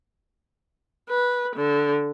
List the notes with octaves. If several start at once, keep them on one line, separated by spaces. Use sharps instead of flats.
B4
D3